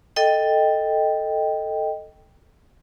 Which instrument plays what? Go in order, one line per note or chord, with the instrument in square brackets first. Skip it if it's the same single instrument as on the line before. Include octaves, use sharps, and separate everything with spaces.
[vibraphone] A4 D#5 G5